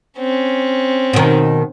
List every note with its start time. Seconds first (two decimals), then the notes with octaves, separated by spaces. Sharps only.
0.18 C4 C#4
1.13 B2 D#3